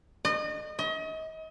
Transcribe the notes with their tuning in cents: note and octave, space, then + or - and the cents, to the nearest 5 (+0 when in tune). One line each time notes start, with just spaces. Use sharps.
D#5 -35
D#5 +35